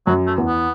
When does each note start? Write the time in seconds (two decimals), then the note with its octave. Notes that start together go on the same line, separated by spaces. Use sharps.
0.07 F#2 F#3
0.27 A3
0.38 E2
0.47 B3